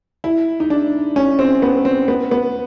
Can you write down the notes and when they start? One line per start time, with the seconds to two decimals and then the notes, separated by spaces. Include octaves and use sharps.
0.24 E4
0.60 D#4
0.70 D4
1.16 C#4
1.39 C4
1.62 B3
1.85 C4
2.08 B3
2.31 B3